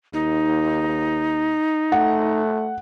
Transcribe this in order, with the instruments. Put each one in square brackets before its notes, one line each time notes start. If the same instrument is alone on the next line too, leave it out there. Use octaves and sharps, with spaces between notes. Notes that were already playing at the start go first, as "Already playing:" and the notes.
[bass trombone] D#2 [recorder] D#4
[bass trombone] A3 [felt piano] F#5